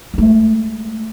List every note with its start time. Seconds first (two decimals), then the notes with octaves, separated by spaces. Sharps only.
0.14 G#3 A3